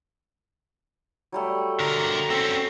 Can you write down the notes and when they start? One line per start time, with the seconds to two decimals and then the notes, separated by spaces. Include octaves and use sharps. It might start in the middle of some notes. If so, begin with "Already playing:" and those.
1.32 F#3 G3 A3
1.80 D3 A#4
2.30 C4 C#4 A4